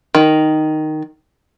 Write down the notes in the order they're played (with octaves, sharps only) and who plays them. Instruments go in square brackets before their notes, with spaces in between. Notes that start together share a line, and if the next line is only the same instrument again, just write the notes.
[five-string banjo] D#3